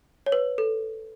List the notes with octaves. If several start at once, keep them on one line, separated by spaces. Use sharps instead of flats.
C#5
B4
A4